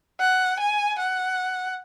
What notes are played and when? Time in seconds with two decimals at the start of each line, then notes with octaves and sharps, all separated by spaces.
0.20 F#5
0.60 G#5
0.99 F#5